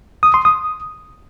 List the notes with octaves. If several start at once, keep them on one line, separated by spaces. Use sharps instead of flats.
D#6
C6
D#6